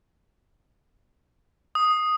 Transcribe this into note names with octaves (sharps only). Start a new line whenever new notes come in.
D#6